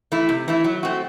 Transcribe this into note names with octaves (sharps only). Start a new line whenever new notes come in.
E3 A3 E4
C3
E3 A3 E4
F#3
A3 C4 F#4